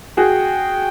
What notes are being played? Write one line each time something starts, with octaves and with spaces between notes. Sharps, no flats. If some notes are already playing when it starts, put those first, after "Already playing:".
F#4 G#4 G5